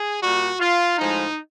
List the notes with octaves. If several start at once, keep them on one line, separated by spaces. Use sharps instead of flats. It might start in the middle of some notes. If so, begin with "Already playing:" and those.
Already playing: G#4
A#2 G3 F#4
F4
A2 F3 G#3 D#4